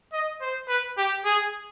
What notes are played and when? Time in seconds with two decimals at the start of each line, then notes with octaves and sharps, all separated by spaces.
0.13 D#5
0.42 C5
0.68 B4
0.98 G4
1.25 G#4